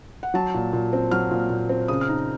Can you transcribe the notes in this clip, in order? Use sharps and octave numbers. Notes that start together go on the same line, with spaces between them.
F#5
F#3 A5
A#2
A#2
C4
F#3 F6
A#2
A#2
C4
C#3 D#6
F6
D#4